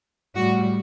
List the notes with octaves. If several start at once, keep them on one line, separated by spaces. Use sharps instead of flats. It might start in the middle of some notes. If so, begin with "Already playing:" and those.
A2 G3 F#4